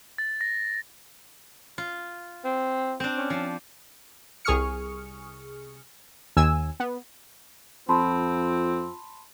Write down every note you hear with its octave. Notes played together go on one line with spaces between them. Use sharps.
A6
A#6
F4
C4
C4 D4
C#4
F3
C2 G#4 C#6 D#6 F6 C#7
D#2 G#5 E6
B3
F2 C4 F4 A5 B5 C6